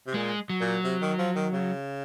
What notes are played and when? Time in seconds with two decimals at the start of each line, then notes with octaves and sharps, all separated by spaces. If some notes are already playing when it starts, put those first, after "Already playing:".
0.07 C3
0.14 A#2 G#3
0.50 F#3
0.61 A#2
0.84 C3
1.01 D#3
1.18 F3
1.35 D#3
1.53 C#3